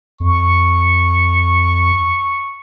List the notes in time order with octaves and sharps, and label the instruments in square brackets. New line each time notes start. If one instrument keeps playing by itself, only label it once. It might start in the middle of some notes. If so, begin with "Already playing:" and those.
[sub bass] F2 [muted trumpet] C#6